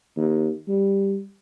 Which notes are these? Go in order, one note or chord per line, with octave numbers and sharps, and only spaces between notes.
D#2
G3